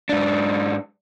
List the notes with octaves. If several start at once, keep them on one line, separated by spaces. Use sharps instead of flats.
G#2 D4